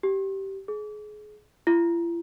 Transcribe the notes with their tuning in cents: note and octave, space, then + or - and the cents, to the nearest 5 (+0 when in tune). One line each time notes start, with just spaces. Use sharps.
G4 -15
G#4 +30
E4 +45